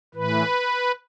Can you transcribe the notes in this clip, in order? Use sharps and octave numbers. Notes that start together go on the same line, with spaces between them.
A2 E3 B4